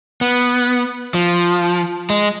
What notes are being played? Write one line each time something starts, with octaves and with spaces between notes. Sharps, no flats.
B3
F3
G#3